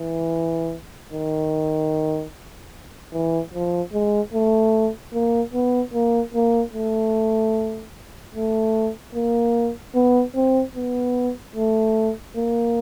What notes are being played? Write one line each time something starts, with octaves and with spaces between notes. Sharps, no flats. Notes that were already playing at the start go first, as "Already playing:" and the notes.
Already playing: E3
D#3
E3
F3
G#3
A3
A#3
B3
A#3
A#3
A3
A3
A#3
B3
C4
B3
A3
A#3